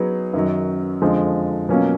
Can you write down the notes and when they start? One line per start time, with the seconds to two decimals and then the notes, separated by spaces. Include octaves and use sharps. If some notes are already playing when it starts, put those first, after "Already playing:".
Already playing: F#3 B3 D#4 G#4
0.34 F#2 D#3 F#3
1.02 F2 D3 F3 G#3
1.69 B2 F#3 A#3 C#4 F4